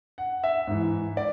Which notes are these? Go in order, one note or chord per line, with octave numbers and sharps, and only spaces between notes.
F#5
E5
G#2 E3
D5